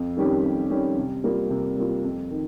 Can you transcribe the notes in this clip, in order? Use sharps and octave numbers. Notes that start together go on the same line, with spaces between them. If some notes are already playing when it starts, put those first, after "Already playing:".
Already playing: F2
D#3 G3 C#4 G4
F2
D#3 G3 C#4 G4
C3
G3 A#3 F4
C3
G3 A#3 F4
F2
D#3